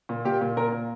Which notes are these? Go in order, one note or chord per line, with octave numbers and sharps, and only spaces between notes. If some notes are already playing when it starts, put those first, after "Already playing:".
A#2
A#2 G4
A#2
A#2 A#4
A#2